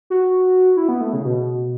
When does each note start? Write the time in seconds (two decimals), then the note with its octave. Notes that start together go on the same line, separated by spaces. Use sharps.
0.10 F#4
0.77 E4
0.89 B3
1.01 A3
1.13 C#3
1.25 B2